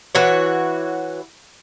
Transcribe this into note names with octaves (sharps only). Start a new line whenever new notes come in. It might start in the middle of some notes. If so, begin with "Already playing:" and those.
E3 F#4 C#5